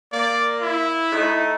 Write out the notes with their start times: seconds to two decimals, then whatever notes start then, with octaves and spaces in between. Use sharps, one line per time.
0.12 A#3 D5
0.62 E4
1.12 A3 D#4